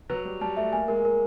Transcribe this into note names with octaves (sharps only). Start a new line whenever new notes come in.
F#3 B4
G3 B4
G3 A5
A3 E5
A#3 G#5
G#3 A#4
A#4